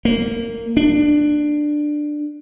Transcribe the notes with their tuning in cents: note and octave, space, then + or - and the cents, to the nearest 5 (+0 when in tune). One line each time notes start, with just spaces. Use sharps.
A#3 -20
D4 +15